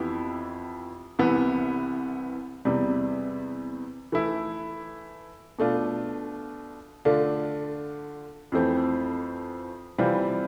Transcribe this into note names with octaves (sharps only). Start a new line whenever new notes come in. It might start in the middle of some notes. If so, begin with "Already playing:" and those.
Already playing: F2 E3 B3 E4 G4
C2 C3 E3 B3
E2 C3 G3
E3 A3 E4
B2 A3 D4 F4
D3 A3 D4 F4
F2 E3 A3 C4
C3 E3 G3 C4 F4